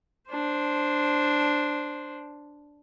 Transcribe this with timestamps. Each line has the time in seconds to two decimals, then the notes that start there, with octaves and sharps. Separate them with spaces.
0.30 D4 C5